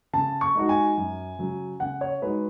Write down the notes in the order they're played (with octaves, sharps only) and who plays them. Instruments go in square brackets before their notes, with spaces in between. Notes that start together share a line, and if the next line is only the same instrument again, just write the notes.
[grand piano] C#3 [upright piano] A5
[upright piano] C#6
[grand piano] G#3 D#4 F#4
[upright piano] G#5
[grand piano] F#2
C#3 F#3
[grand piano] C#3 [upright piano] F#5
[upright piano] C#5
[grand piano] G#3 D#4 F#4 [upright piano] B4